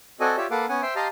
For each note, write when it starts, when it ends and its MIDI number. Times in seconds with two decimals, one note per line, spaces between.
0.20 0.36 60
0.20 0.36 66
0.20 0.36 69
0.20 0.36 74
0.20 0.36 75
0.20 0.36 80
0.37 0.46 65
0.37 0.46 67
0.37 0.46 73
0.37 0.46 74
0.37 0.46 76
0.51 0.66 58
0.51 0.66 69
0.51 0.66 71
0.51 0.66 77
0.51 0.66 78
0.51 0.66 86
0.69 0.82 59
0.69 0.82 61
0.69 0.82 78
0.69 0.82 80
0.82 0.94 72
0.82 0.94 76
0.82 0.94 79
0.82 0.94 84
0.96 1.08 67
0.96 1.08 75
0.96 1.08 77
0.96 1.08 81
0.96 1.08 82
0.96 1.08 84